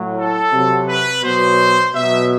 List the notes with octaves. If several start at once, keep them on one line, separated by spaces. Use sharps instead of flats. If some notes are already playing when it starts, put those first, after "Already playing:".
Already playing: A2 F#3
A4
C3 F#3
B4
B2 F#3 C5
B2 F#3 E5